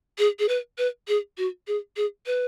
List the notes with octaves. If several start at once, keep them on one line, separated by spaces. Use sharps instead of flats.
G#4
G#4
B4
B4
G#4
F#4
G#4
G#4
B4